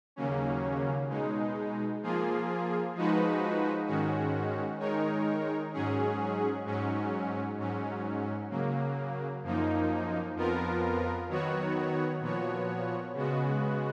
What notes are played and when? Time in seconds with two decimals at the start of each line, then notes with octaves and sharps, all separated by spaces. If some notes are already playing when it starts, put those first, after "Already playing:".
0.16 D#2 C#3 F#3 A#3 C#4
1.09 B2 G#3 D#4
2.02 F3 A#3 F4 G#4
2.95 F3 G#3 D#4 F#4 B4
3.87 G#2 D#3 G#3 C#4 F#4
4.79 D#3 G#3 D#4 A#4 C#5
5.73 G#2 F#3 C#4 G#4
6.65 G#2 F#3 C#4
7.58 G#2 F#3 C#4
8.50 C#3 F#3 A#3
9.43 F#2 F3 A#3 D#4
10.35 F2 F3 B3 F4 A#4
11.28 D#3 F#3 B3 F#4 C#5
12.20 A#2 F3 B3 F#4 C#5
13.14 C#3 G#3 B3 F#4